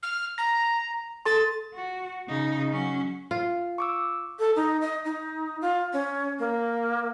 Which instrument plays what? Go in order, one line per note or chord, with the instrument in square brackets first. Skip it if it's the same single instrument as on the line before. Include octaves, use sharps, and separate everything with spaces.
[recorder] F6
[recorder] A#5 [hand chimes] A#6
[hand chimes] A4 A5 C6 [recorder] A6
[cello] F#4
C#3 D#4
F#3 C#4
[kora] F4
[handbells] C#6 D6 E6
[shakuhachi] A4
D#4
D#5
D#4
F4
C#4
A#3